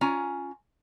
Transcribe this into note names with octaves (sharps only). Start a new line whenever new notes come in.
C#4 F4 G#5 A#5